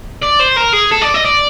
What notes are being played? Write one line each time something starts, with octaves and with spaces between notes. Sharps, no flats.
D5
C5
A#4
G#4
A4
D5
D#5
D5